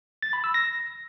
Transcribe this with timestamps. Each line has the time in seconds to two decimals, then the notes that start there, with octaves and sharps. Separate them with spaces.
0.22 A6
0.33 B5
0.44 E6
0.54 A#6